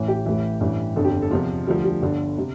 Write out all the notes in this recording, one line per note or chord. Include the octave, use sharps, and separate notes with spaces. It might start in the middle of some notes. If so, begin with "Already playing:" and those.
Already playing: A1 A2 E3
G4
A1 A2 E3
A1 G2 E3
G1 F2 D3 A4
G4
A4
E2 C3 F3 F4
D2 D3 F3 G3
G3
G1 G2 D3
C3